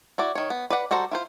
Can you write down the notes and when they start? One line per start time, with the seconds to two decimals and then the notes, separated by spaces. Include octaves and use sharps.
0.18 E4 F#4 D5
0.35 D#3 C#5
0.50 B3
0.70 B4 D5 F#5 B5
0.91 G3 F#4 A4 C5 A#5
1.11 E4 F4 C5